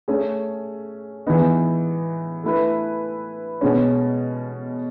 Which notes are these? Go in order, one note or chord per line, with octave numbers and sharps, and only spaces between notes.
A3 C#4 G#4
E3 G#3 B3 D#4
A3 E4 B4
B2 G#3 C#4